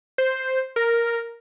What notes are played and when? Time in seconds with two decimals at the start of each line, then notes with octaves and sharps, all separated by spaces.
0.18 C5
0.76 A#4